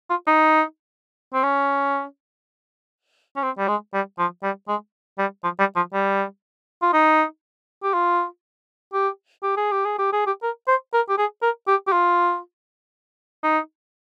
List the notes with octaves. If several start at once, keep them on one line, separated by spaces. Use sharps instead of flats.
F4
D#4
C4
C#4
C#4
C4
G3
G#3
G3
F3
G3
G#3
G3
F3
G3
F3
G3
F4
D#4
G4
F4
G4
G4
G#4
G4
G#4
G4
G#4
G4
A#4
C5
A#4
G4
G#4
A#4
G4
G4
F4
D#4